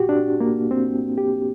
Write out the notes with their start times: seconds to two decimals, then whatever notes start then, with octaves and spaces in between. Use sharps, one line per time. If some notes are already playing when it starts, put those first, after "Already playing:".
Already playing: A#2 F#4 G4
0.09 D4
0.40 A#3
0.71 C4
1.18 G4